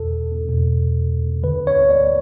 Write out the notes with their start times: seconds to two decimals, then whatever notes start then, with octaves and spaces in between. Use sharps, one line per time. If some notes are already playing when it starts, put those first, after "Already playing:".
Already playing: E2 B2 A4
0.49 E2 B2
1.43 D2 D3 B4
1.67 C#5
1.90 D5